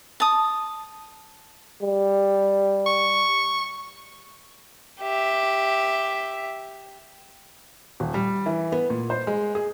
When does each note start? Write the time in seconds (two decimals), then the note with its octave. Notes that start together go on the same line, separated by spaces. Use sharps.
0.20 A5 D#6
1.83 G3
2.86 C#6
5.01 G4 E5
8.00 D#1
8.14 G3
8.46 E3
8.72 B3
8.90 A#2
9.10 C5
9.27 G#3
9.55 G#4